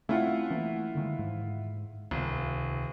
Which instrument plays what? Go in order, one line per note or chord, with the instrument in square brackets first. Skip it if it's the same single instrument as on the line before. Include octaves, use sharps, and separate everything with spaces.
[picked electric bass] A3 C4 C#4 [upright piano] E4 F4 F#5
[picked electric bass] E3 A3 A#3
D3 D#3 G#3
G#2
[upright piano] D#1 [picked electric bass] C#2 C3